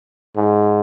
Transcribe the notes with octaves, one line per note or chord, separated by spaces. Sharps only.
G#2